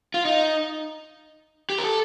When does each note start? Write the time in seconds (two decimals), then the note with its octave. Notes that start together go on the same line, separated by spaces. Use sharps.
0.14 F4
0.25 D#4
1.70 G4
1.78 A#4
1.84 A4